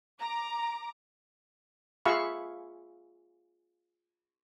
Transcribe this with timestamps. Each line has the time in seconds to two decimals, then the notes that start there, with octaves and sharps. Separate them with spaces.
0.19 A#5 D6
2.05 F4 G#4 E5 F5 B5 C#6